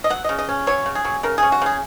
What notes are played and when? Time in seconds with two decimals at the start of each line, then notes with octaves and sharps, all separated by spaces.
0.04 D#5
0.10 F#3 F#5
0.24 C#3 D#5
0.39 D#5
0.49 C#4
0.67 F#3 C#5
0.86 C#3
0.95 G#4
1.05 F#3
1.23 C#3 A#4
1.38 C#4 G#4
1.52 F#4
1.62 C#3 G#4